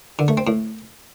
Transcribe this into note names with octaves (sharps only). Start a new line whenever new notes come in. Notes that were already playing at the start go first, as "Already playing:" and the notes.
D3
A3
C4
A2